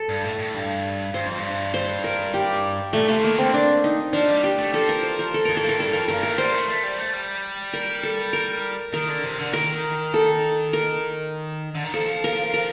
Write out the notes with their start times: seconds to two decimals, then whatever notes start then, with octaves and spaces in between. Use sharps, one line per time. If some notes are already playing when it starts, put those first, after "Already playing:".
Already playing: A4
0.09 G2
0.24 A2
0.39 A2
0.54 G2
1.14 G2 C5
1.26 F2
1.38 G2
1.74 C5
2.04 A#4
2.34 G4
2.93 A#2 A3
3.03 A#2
3.08 C3 A3
3.23 D#3 A#3
3.38 D3 C4
3.54 D4
3.84 D#4
4.13 F3 D4
4.29 G3
4.44 G4
4.58 A3
4.73 F3 A4
4.89 A#4
5.03 C5
5.19 A#4
5.34 A4
5.45 F2 A#4
5.57 A4
5.64 A2
5.69 A#4
5.79 G2 A4
5.93 F2 A#4
6.08 G2 A#4
6.23 A2 A#4
6.32 A3
6.38 G3 C5
6.54 A3
6.68 A3
6.84 G3
6.98 A3
7.14 G3
7.73 A#4
8.03 A4
8.33 A#4
8.93 D#3 A#4
9.08 D3
9.24 C3
9.39 D3
9.53 D#3 A#4
10.14 A4
10.73 A#4
11.75 D3
11.84 D#3
11.94 F3 A4
12.24 A#4
12.54 A#4